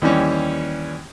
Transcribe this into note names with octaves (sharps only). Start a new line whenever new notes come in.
D#2 E3 G3 C#4